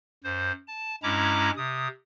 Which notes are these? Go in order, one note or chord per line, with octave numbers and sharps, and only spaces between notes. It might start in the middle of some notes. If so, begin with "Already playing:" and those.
F#2 C5
A5
G2 G#3 C#4 E4 A#5 D6
C3 D#6